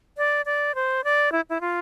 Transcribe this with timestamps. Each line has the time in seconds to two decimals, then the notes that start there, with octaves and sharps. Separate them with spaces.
0.17 D5
0.46 D5
0.75 C5
1.04 D5
1.32 E4
1.50 E4
1.61 F4